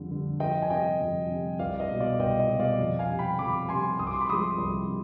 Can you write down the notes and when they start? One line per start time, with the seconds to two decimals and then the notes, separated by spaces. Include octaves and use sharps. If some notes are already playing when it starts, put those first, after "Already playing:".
Already playing: F2 D3 G3
0.11 D3 G3
0.40 F2 D#5 G5
0.62 G#5
0.70 C3 G3 D#5 G5
1.01 F2
1.29 C3 G3
1.59 C2 D5 F5
1.80 D#5
1.90 B2 G#3
2.00 D5 F5
2.19 C2 D#5 G5
2.40 D#5
2.50 B2 G#3
2.59 D5 F5
2.79 F2
2.99 F5 G#5
3.09 C3 G3
3.19 G5 B5
3.39 F2 B5 D6
3.69 C3 G3 G#5 C6
3.99 C2 D#6
4.07 D6
4.13 C6
4.21 B5 D6
4.28 C3 F3 G#3 C6 D#6
4.58 C2
4.88 C3